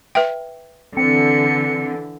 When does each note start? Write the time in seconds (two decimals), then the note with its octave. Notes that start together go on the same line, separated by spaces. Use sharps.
0.15 B4 E5 G5
0.97 D3 E3 C4 C#7